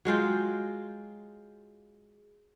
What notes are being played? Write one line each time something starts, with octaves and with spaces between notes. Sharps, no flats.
F#3 G#3 F4 G5